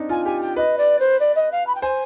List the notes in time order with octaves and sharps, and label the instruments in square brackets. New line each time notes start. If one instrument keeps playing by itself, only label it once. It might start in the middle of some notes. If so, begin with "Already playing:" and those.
Already playing: [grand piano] C4 D4 D#4
[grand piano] F4 [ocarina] G#5
[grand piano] G4 [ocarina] G#5
[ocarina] G5
[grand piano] B4 [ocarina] D#5
[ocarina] D5
C5
D5
D#5
F5
B5
G5
[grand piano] C5 [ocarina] G#5